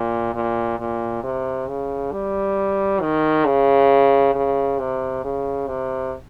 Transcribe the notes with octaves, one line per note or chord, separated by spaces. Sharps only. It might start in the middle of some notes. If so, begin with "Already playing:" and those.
Already playing: A#2
A#2
A#2
C3
C#3
G3
D#3
C#3
C#3
C3
C#3
C3